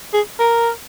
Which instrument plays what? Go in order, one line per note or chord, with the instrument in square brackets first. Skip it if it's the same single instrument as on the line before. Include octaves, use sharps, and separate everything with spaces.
[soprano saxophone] G#4
A#4